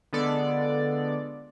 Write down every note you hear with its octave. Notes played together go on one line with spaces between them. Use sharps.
D3 G#3 B3 F4 A4 D5